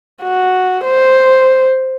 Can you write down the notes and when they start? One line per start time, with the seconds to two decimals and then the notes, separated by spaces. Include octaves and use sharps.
0.22 F#4
0.84 C5